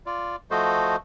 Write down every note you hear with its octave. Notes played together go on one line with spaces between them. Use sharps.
F4 D5
F3 A3 F#4 A4 C5 D#5